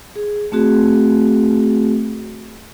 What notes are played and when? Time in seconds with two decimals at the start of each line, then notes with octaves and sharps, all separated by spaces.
0.16 G#4
0.52 A3 C4 F#4 G#4